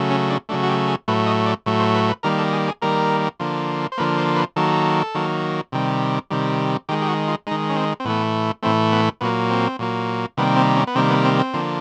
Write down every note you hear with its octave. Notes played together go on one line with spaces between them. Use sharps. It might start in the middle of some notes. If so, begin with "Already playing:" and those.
Already playing: C#3 F#3 A3
C#4
D4
C#3 F#3 A3 D4
F#4
G4
G#4
A2 F#3 A3 B4
D#5
D5
A2 F#3 A3
C5
B4
B4
D#3 G3 A#3 A#4
A4
G#4
G#4
D#3 G3 A#3 A#4
D3 F3 A#3
C5
D3 F3 A#3 B4
C5
B4
D#3 F#3 A#3 A4
D#3 F#3 A#3
C3 D#3 G3
C3 D#3 G3
D#3 G#3 G4
G4
F#4
F4
D#3 G#3 D#4
C#4
C4
C4
A2 E3 A3 B3
A2 E3 A3 C4
B3
A#2 F#3 A#3 B3
C4
A#2 F#3 A#3
C3 D#3 G3 A#3 B3
C4
C#4
B3
C3 D#3 G3 A#3 C4
B3
C4
C4
D3 F3 A#3